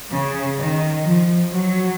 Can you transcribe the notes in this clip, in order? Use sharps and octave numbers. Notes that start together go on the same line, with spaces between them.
C#3
D#3
F3
F#3